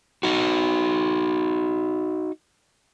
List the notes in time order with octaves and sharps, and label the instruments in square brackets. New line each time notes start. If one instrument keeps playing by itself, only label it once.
[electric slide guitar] D#4 F#4